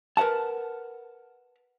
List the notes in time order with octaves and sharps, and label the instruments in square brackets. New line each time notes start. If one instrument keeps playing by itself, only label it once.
[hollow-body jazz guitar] A#4 B4 D5 F#5 A5